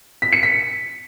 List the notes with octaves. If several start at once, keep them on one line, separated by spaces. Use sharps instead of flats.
B6
C#7
B6